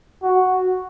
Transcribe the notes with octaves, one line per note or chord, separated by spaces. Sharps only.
F#4